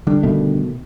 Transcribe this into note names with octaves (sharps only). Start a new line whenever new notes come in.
D3 G3 D4
B2 D#3 A3